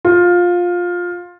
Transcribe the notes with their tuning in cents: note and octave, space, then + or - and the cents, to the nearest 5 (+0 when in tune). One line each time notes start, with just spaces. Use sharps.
F4 +15